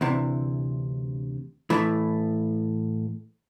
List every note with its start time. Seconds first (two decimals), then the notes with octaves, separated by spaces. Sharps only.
0.01 D2 C3 E3
1.70 A2 E3 A3